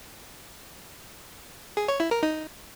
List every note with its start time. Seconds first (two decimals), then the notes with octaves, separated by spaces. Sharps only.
1.77 G#4
1.88 C#5
2.00 E4
2.11 A#4
2.23 D#4